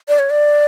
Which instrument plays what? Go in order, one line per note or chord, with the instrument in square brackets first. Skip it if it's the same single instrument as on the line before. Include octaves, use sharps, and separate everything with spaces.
[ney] D5
C#5
D5